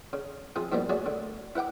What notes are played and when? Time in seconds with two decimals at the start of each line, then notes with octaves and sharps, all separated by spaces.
0.13 C#3
0.56 C3 F3 C4 G#4
0.72 G#2 B2 F3 G3 A#3
0.89 F#3 A3 F#4 G#4 D5
1.06 D3
1.55 E4 B4 F#5 G5 D6